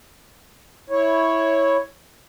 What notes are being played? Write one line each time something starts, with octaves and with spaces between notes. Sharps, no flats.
E4 C#5